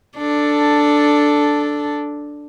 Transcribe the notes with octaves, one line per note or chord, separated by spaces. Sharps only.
D4 A4